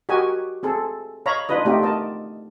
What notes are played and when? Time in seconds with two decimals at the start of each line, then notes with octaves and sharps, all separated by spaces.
0.09 F#4 G4 A#4 D#5 G#5
0.63 C4 G#4 A4
1.26 C#5 D#5 F5 A#5 B5
1.49 D4 D#4 F4 B4 D#5
1.65 A3 B3 C4 D#4 F4 G4
1.82 A#4 D#5 A5